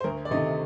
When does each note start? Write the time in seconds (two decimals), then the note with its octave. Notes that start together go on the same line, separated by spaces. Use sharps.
0.01 C5
0.04 D2 A#4
0.25 D5
0.31 C3 D#3 A3 D#5